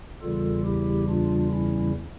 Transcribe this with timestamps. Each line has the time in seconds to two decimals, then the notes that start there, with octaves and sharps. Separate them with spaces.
0.21 E2 C#3 E3 G3 F4 A4
0.65 E4 G4
1.09 D4 F4
1.53 C#4 E4